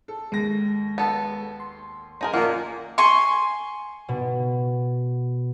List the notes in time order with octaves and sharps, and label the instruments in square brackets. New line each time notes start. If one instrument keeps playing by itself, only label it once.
[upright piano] A4
[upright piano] D#2 A#6 [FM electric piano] G#3
[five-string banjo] B3 A4
[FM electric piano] C6
[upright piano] F#2 [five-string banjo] D#4 G#4 A#4
[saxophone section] A#2 D#3 A#3 [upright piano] F3 [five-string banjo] F#5
[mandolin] G#5 C6 C#6
[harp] B2